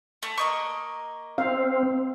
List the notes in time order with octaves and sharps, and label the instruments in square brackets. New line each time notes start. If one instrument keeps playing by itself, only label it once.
[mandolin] A3
A#3 D#5 C#6
[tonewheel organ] C4 [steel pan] F5